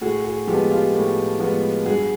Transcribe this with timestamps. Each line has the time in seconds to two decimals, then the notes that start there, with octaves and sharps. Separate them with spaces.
0.01 A2 F#4 G#4
0.25 F#4 G#4
0.47 F3 G#3 B3 G4 A4
0.70 F4 G4
0.94 A2
1.40 F3 G#3 B3
1.85 G2 F#4 G#4